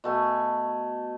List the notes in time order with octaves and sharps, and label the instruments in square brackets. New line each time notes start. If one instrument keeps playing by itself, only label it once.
[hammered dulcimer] B2 A3 G#5